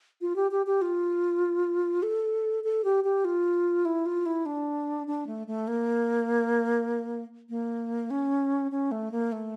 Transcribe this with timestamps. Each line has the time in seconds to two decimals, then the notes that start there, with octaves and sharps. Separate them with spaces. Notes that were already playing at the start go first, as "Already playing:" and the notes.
0.21 F4
0.36 G4
0.51 G4
0.66 G4
0.82 F4
2.03 A4
2.64 A4
2.84 G4
3.04 G4
3.25 F4
3.85 E4
4.06 F4
4.26 E4
4.46 D4
5.07 D4
5.27 A3
5.47 A3
5.68 A#3
7.49 A#3
8.10 C#4
8.71 C#4
8.91 A3
9.11 A#3
9.32 A3